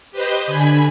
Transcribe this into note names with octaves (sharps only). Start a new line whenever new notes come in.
G4 B4 C5 D#5 G5
D3 G#5 B5